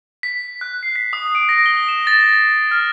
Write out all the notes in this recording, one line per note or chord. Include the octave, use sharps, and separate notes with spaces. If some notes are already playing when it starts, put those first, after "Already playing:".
B6
F#6
C7
B6
D#6
D7
A#6
G7
E7
A6
A6
F6